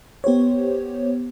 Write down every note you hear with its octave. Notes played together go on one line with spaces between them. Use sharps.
B3 G4 C5 C#5